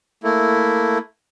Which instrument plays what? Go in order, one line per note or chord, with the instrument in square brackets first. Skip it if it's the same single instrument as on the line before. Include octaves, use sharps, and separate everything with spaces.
[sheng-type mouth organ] A3 A#3 E4